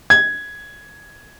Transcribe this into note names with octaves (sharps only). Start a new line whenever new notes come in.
G#6